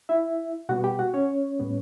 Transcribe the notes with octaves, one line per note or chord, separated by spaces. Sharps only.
E4 E5
B2 G3 B3 F#4 F#5
G4 G5
F#4 F#5
C#4 C#5
A2 G3 B3